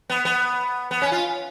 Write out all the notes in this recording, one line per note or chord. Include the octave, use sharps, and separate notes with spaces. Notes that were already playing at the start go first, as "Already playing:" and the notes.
B3
B3
B3
C#4
F4